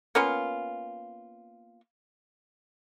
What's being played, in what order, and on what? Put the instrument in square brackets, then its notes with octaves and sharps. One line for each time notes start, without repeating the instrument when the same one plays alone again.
[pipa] A#3 B3 C#4 F4